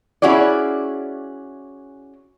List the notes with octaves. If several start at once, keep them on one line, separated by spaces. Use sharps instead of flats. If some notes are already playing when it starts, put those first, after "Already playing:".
C#4 E4 F#4 G#4 D5